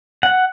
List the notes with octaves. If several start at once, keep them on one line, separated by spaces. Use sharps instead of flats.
F#5